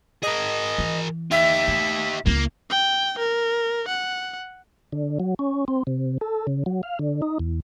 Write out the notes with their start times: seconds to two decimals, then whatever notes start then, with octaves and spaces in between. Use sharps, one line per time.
0.23 G#4 A#4 D#5
0.78 E3
1.31 D#4 G4 E5
1.68 A3
2.26 C#2 A#3 E4
2.70 G5
3.18 A#4
3.88 F#5
4.93 D3
5.20 F#3
5.39 C#4
5.68 C4
5.87 C3
6.21 A4
6.47 C#3
6.66 F#3
6.83 F5
6.99 D3
7.22 D#4
7.39 E2